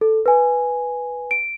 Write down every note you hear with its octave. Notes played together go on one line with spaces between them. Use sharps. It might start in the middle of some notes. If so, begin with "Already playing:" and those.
A4
B4 G#5
D7